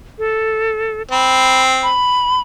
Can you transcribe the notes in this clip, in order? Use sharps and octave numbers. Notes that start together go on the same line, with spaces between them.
A4
C4 B5
B5